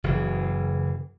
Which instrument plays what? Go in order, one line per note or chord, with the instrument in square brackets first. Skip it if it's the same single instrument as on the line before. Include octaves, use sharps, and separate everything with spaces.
[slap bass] F#1 C#3 E3